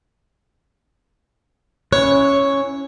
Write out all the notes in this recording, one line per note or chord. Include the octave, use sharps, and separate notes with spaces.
C#4 E4 C#5 F#6